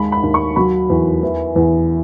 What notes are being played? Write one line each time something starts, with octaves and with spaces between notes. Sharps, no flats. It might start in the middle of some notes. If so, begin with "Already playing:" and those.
Already playing: D#2 G#3 B5
B5
D#2
C#6
F#3 B5
E2
E3
E2